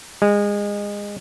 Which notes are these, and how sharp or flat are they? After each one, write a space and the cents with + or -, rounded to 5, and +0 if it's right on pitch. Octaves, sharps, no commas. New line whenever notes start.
G#3 -25